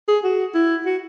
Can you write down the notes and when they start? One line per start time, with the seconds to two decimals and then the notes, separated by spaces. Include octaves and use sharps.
0.08 G#4
0.24 F#4
0.54 E4
0.86 F#4